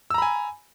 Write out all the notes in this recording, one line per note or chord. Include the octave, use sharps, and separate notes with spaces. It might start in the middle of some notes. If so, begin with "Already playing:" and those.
G#5 A#5 B5 E6